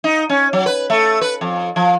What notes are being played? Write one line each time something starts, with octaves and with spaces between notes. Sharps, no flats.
D#4
C#4
F#3
B4
A3
B4
F2
F3